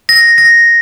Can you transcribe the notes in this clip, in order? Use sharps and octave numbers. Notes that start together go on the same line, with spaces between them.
A#6
A#6